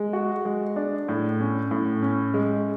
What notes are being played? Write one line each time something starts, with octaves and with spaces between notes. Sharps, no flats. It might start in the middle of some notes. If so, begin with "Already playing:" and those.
Already playing: G#3
F#4
G#3
D4
A2
C#4
A2
C#4
G#3